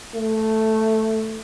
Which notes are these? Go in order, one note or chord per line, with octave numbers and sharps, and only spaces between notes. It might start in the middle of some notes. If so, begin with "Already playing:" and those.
A3